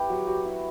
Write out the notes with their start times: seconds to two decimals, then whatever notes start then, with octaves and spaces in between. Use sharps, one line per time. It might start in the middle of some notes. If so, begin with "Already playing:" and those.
Already playing: B3 E4 G4
0.10 F#3
0.27 F#3
0.45 E4